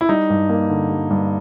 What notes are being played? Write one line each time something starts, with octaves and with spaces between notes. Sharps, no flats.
E4
G3 D#4
G2
A#3
D3
G3
G2